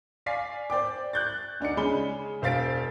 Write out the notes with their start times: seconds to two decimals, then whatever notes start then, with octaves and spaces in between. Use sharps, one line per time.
0.26 D5 F5 G#5 B6 C7
0.70 C5 D5 G5 D6
1.13 F#6 G6 A6
1.60 D2 D4 D#4 C#7
1.77 C#3 G#3 B5 G7
2.42 E1 C5 F5 A6 B6 D7